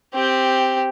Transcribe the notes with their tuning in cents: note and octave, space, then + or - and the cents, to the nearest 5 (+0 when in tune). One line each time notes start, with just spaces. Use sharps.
C4 +0 G4 +0